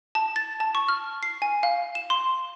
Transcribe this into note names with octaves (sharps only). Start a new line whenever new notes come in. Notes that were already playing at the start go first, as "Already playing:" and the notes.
A5
A6
A5
C#6
F6
C7
G#5
F5
E7
C6